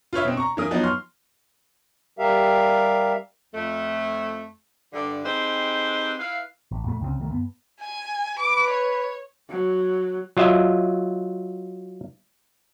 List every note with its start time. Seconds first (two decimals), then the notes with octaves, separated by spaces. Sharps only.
0.13 F4 B4 C#5 E5
0.25 B2 C4
0.37 A#5 C#6
0.57 E3 A#3 D#6
0.71 F3 F#3 B3 D#4
0.83 C6 C#6 F6
2.19 G3 G4 A#4 E5 F5
3.54 F2 A3
4.93 G2 D3
5.25 C4 D#4 G4 G#4 B4 C5
6.19 E4 B4 E5 F5
6.71 A1
6.85 F2 A#2 G3 A3
7.01 C#2 C#3 E3 C4
7.19 C#2 D#3 G3 A3
7.31 G2 B3
7.81 G#5
8.39 B4 D6
8.71 C#5
9.49 F#3
10.37 F#3 F4 D#5 E5